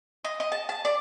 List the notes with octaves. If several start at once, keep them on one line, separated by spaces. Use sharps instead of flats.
D#5
D#5
A5
A5
D5